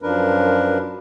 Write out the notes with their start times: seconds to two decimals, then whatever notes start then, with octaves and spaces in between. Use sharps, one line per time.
0.02 F#2 F3 D4 A#4 B4